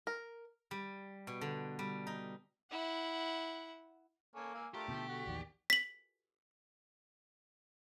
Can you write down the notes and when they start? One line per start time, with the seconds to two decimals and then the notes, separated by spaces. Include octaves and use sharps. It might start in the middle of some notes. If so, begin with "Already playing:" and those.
0.07 A#4
0.71 G3
1.27 B2
1.41 D3
1.79 G3
2.07 D#4
2.71 E4 F#5
4.36 A#3 A4 C#5 G#5
4.54 F5 G#5 E6
4.74 A3 D4 F4 G4 A#4
4.88 B2 D3 F3
5.09 A3 F#4
5.26 A#1 E2 D#3 D5
5.70 B6 F#7